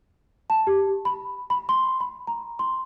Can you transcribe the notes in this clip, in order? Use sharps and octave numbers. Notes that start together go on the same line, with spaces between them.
A5
G4
B5
B5
C6
B5
A#5
C6